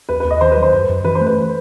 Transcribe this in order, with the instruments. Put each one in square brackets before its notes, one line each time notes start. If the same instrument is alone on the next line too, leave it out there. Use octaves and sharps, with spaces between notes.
[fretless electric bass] D#2 [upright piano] B4
[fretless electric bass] D#2 [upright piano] B4
[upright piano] D#5
[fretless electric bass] D#3 [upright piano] C5
[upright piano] B4
[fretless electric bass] F#3
[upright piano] C5
[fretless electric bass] F#2
F#2
[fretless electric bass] E3 [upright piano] B4
[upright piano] C5
[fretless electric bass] A3
[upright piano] B4